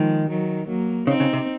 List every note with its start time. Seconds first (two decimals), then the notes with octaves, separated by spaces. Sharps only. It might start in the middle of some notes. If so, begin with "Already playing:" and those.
Already playing: D#3 F3 G#3
0.29 D#3 F#3
0.68 F#3 A#3
1.07 C#3 C4 D#4
1.20 C#3
1.33 C3